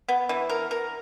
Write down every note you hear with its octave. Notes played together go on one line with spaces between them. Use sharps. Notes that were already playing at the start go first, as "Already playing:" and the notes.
B3
E3
A#4
A#4